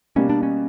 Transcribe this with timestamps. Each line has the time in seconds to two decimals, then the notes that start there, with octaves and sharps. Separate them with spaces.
0.16 B2 G3 A#3 C#4
0.29 D4
0.43 C#4